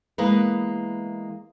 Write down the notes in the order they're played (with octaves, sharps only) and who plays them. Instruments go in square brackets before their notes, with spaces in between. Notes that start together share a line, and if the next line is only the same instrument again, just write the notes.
[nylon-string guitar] E3 G#3 A#3 B3 A#4 B4